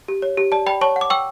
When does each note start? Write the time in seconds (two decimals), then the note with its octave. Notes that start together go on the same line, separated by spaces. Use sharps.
0.08 G4
0.22 C#5
0.37 G4
0.52 D5 A5
0.66 D5 G5 B5
0.81 C#5 A5 C#6
0.96 F#5
1.01 D6
1.10 G5 C#6 E6